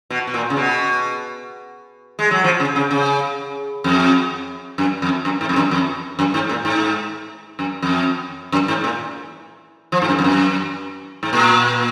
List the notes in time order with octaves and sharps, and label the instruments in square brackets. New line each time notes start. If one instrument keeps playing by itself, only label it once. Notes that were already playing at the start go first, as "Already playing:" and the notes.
[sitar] B2
B2
A#2
C#3
B2
G#3
F#3
F3
C#3
C#3
C#3
F2
F#2
F2
F#2
G#2
F2
F#2
F2
F#2
G#2
A#2
G#2
F#2
F2
F#2
G#2
A#2
F3
G#2
F#2
F2
F#2
G#2
A#2